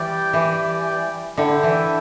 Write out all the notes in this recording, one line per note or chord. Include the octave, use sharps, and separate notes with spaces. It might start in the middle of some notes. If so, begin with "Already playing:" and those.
Already playing: E3 G3 G4 D5 G5
E3
D3 E4 A4 E5 G5
E3